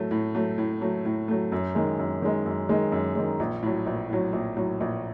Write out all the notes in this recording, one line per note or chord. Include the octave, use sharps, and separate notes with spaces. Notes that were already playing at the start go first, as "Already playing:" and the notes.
Already playing: A2 F#3 A3
A2
F#3 A3
A2
F#3 A3
A2
F#3 A3
F#2
D#3 G#3
F#2
D#3 G#3
F#2
D#3 G#3
F#2
D#3 G#3
A#1
A2 F#3
A#1
A2 F#3
A#1
A2 F#3
A#1